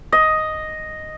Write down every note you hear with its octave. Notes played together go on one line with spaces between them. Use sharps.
D#5